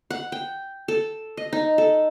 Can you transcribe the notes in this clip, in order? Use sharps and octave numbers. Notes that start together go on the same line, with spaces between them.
F#5
G5
A4
D#5
D#4
A4